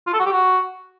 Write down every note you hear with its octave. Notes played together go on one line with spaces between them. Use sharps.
F4
A4
F#4
G4
F#4